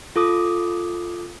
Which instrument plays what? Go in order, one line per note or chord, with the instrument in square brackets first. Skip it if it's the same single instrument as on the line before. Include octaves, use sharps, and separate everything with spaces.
[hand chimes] F4 A4 D6 D#6